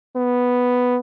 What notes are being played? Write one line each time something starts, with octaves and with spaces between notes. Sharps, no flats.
B3